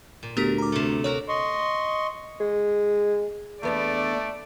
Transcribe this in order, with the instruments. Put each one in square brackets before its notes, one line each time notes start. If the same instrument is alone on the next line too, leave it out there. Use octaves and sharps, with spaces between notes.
[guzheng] A#2
[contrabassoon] D2 [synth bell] B3 G4 B6 [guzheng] A#4
[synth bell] A#5 D6
[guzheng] C3 A3
[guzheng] F#4 A#4 A#5 [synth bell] C#5
[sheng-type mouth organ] D#5 C6 C#6
[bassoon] G#3
[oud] E2 B3 D4 [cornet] A3 [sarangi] D5